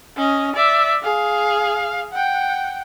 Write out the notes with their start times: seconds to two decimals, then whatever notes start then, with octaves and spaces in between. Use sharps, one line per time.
0.16 C#4 D#5
0.56 D5 E5
1.03 G#4 F5
2.12 F#5 G5